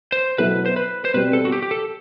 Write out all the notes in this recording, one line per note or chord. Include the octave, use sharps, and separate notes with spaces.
C5
B2 F#3 B3 E4 A4 B4
C5
B4
C5
B2 G3 C4 B4
A4
F#4
G4
G4
A4